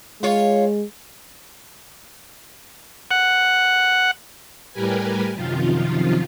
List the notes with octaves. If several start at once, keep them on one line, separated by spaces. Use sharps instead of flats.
G#3 F4 C#5
F#5
A2 G3 G4 A#4 B4 G#5
F#2 C3 D#3 F3 F4